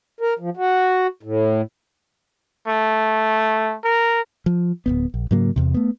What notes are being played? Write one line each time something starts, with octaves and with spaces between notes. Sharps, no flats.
A#4
F3
F#4
A2
A3
A#4
F3
D1 F2 B3
A#1
G#2 C#3 F#3 A#3
E2 C3
A3 B3